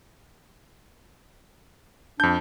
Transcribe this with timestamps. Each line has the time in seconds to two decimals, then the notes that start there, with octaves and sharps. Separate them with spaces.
2.20 F2 D4 G6